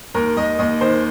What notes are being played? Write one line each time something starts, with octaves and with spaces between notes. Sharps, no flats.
D#2 A#4
D#2 D#5
D#2 D#5
D#3 C5